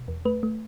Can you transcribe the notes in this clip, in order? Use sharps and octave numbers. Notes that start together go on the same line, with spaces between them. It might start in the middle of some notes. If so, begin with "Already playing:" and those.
Already playing: B2
E2
A3 B4
A3